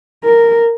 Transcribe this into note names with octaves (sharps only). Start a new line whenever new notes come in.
A#4